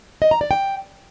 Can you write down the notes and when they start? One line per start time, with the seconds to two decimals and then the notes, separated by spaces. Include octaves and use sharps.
0.22 D#5
0.31 A#5
0.41 D5
0.51 G5